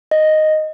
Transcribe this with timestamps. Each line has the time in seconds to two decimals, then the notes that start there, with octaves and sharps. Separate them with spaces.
0.11 D#5